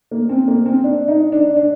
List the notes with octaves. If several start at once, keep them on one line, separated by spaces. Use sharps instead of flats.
A#3
C4
A#3
C4
D4
D#4
D4
D4